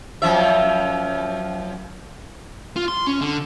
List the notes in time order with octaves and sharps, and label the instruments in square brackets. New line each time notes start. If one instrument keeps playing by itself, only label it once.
[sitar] F#2 F3 E5
[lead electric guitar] F4
C6
C#4
D3